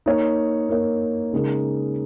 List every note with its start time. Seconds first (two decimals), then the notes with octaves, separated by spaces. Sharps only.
0.06 A#3 D#4 A#4 C#5
0.69 A#3 D#4 A#4 C#5
1.33 C#3 G#3 D#4 A#4